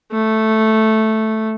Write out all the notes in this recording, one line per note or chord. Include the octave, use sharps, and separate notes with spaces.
A3